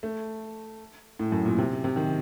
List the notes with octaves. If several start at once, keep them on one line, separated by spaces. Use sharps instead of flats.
A3
A2
F#2
A#2
C3
C3
D#3